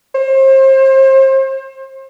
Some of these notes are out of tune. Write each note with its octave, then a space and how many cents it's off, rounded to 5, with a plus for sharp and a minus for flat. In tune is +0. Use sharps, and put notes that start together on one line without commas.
C5 +35